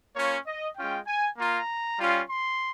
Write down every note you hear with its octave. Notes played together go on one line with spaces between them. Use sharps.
A#3 C#4 F4 C#5
D#5
G#3 C#4 F4 G5
G#5
A#3 F4 A#5
G3 C#4 F4
C6